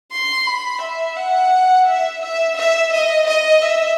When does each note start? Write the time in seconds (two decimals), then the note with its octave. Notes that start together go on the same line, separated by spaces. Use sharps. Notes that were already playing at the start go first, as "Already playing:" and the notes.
0.12 C6
0.47 B5
0.82 E5
1.16 F#5
1.86 E5
2.22 E5
2.57 E5
2.93 D#5
3.28 D#5
3.62 E5